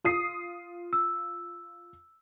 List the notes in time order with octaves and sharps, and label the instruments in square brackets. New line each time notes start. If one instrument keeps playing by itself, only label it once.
[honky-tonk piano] F4 D#6 C7
[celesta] E6